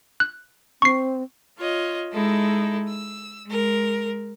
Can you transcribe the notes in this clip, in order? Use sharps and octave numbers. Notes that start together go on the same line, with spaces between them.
F#6
C4 C#6 C7
F4 C#5 D#5
G#3 D#4 E4 A4
E6
G#3 A#4